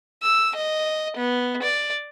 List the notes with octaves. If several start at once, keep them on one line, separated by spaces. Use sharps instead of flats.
E6
D#5
B3
D5